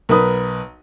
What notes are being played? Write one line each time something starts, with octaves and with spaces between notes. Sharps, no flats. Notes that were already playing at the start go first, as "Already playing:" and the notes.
B1 A#4 B4 D#6